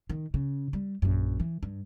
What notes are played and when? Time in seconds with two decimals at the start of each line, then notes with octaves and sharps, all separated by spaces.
0.09 D#3
0.34 C#3
0.73 G3
1.02 A#1 F#2
1.40 E3
1.63 G2